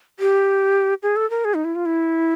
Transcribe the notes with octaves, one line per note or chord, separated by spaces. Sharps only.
G4
G#4
A4
A#4
G#4
D#4
E4
F4
E4